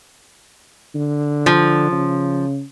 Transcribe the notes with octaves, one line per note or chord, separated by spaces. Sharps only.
D3
F3
C#3